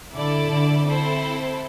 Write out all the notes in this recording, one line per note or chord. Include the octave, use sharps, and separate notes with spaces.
D3 E4 A4 D5
D3
C4 E4 A4 C5